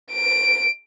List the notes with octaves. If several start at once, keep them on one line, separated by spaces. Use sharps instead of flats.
D7